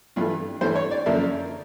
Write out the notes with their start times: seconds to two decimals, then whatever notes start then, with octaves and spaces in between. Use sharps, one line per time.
0.16 G2 E3 A3 F4
0.61 G2 E3 A3 C5
0.76 C#5
0.91 D5
1.06 F#2 D3 F3 A#3 D4 E5